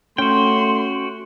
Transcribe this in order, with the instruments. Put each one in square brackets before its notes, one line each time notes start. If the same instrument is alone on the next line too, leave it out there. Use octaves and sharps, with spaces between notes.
[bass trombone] A3 [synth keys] C#4 [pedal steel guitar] F#4 G5 [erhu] C6